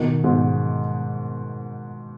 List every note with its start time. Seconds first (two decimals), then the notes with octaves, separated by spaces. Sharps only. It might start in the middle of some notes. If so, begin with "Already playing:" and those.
Already playing: B2 D#3
0.24 G#2 B2